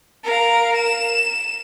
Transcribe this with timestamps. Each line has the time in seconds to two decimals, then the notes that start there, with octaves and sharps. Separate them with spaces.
0.24 A#4 F5
0.76 E7